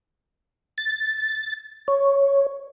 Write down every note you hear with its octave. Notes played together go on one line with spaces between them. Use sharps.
A6
C#5